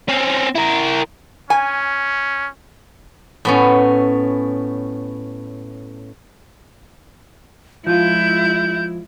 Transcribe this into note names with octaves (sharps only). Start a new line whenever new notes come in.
C4 C#4
E4 A#4
C#4 G#5
A2 B3 C#4
F3 G#3 E4 F4 G6